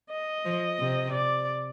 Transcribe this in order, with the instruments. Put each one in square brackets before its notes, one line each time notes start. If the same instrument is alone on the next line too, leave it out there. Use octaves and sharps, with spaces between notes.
[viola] D#5
[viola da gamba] F3
C3
[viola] D5